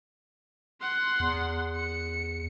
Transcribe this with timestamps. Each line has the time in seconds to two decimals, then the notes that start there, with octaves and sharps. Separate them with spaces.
0.81 F#5 C6
1.20 E2
1.76 C#7